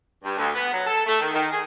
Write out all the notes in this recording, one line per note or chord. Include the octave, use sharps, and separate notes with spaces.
G2
D2
B3
F#3
A4
A3
D#3
D#3
G#4